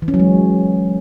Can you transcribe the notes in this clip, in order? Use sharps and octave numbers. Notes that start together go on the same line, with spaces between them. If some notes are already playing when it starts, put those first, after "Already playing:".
E3
C#4
F#3
G#3